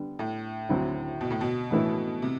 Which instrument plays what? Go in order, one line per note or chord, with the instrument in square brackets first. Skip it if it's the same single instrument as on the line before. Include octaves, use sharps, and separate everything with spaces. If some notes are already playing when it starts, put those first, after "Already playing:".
Already playing: [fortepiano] D3 G3 B3
[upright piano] A2
[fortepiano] D2 D3 F#3 C4 E4
[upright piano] B2
A2
B2
[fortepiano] A2 E3 A3 E4
[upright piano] C3